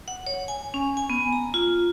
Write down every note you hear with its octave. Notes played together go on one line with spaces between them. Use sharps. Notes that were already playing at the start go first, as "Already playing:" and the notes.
F#5
C#5
G#5
C#4
G#5
B3
A#5
F4